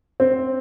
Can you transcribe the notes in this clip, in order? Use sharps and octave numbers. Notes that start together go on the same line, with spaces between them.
C4